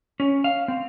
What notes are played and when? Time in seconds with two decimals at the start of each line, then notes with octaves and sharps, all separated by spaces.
0.20 C#4
0.44 F5
0.68 C4